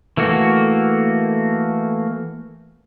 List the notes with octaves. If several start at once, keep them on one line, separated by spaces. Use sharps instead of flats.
E3 A3 A#3 F#4